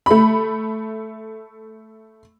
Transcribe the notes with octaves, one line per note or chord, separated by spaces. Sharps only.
A3 B5